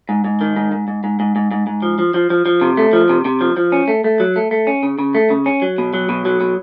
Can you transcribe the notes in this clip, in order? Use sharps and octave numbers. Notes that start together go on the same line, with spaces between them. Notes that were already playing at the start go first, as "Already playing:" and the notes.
G#2
G#2
D#3
G#2
G#2
G#2
G#2
G#2
G#2
G#2
G#2
F3
F3
F3
F3
F3
C3
A3
F3
C3
C3
F3
F3
C#4
A3
A3
F#3
A3
A3
C#4
C#3
C#3
A3
C#3
C#4
F#3
B2
F#3
B2
F#3
B2